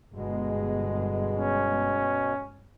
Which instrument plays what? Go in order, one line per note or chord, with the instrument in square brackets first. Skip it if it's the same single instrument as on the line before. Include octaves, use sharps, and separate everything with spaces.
[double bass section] G1 G#3 [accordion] B2
[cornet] C#4